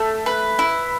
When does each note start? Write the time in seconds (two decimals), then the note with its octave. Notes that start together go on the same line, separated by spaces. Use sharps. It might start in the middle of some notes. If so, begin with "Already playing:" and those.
Already playing: A3
0.26 B4
0.59 E4